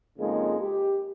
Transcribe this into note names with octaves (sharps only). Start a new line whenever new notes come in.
F2 C#3 G#3 A#3 D#4
G4